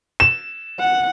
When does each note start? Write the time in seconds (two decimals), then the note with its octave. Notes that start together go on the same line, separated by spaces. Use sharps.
0.20 E7
0.80 F#5